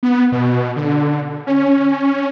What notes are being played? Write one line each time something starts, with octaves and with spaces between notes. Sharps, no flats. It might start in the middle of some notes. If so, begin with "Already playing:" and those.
B3
B2
D3
C#4